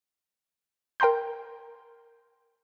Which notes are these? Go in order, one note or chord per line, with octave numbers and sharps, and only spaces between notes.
A#4 G5 A#5 C6 G6